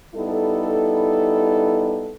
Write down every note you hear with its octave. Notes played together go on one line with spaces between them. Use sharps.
G3 B3 D#4 E4 A4